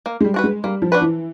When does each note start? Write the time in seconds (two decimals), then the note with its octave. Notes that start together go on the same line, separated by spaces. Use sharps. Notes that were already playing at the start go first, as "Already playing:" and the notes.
0.06 A#3
0.21 G#3
0.24 G3
0.34 D4 F#4 B4
0.44 G#3
0.64 G3 A#3
0.82 F3
0.92 D4 F#4 B4
1.01 E3